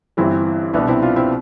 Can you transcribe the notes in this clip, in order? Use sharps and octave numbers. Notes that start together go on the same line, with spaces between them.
G1 G2 E3 C4 E4
C2 B2 B3 D4
C4 E4
D4 F4
C4 E4